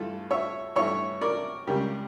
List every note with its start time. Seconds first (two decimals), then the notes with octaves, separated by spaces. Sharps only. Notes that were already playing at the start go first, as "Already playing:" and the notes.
Already playing: G2 E3 A3 F4 A4
0.31 C#5 E5
0.76 G2 E3 A3 C#5 E5
1.21 A#4 D5
1.67 C#2 C#3 G3 G4 A#4